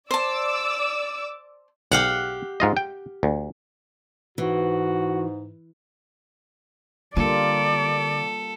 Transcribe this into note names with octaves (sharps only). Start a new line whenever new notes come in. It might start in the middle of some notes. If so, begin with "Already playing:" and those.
C5 D5 A5 D6 E6
B1 G4 F5 F#5
G#2 F4 D#5
G5
D2
G#2 E3 F#4
D3 G3 A#3 F4 A4 D5